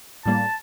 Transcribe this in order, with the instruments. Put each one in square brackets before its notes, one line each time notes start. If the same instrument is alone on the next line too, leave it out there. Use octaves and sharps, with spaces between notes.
[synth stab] A2 G3 A#3 [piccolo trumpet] A5